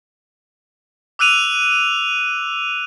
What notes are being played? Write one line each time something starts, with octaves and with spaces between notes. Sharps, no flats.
D6 E6 F#6 D#7 F7